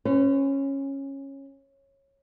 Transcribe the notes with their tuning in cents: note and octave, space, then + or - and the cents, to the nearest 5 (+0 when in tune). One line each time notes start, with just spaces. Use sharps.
C#4 -15 B4 +45